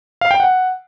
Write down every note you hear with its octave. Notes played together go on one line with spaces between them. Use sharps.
F5
G5
F#5